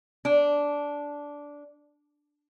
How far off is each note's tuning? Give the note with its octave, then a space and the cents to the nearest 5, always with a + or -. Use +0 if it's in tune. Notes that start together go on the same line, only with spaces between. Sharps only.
D4 -10